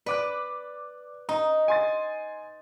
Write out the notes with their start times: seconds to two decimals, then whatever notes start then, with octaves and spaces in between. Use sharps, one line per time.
0.06 B4 D5 D6 F#6
1.29 D#4 A#5
1.68 G#5 C6 A6